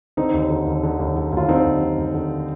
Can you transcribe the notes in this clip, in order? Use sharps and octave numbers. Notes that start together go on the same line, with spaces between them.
D3 C4 D#4
D#2
D3
D#2
D3
D#2
D3
D#2 F4
D3 C4 D#4
D#2
D3
D#2
D3